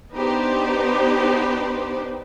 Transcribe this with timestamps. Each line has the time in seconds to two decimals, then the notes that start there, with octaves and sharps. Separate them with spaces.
0.14 B3 D4 D#4 G4 B4 C5